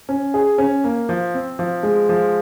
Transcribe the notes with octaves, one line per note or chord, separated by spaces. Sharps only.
C#4
G#4
C#4
A#3
F3
C4
F3
G#3
F3